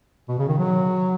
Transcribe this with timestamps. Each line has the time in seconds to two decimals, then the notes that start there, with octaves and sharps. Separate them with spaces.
0.29 B2
0.39 C#3
0.48 D#3
0.58 F#3